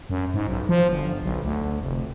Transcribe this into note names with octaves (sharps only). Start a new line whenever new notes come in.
F#2
G#2
B1
F3
G1
B1
D2
F1